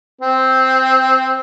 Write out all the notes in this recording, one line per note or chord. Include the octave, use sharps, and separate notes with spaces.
C4